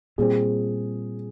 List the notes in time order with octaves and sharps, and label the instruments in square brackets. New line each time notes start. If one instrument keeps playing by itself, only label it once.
[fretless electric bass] A#2 G3 C4 [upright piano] G#4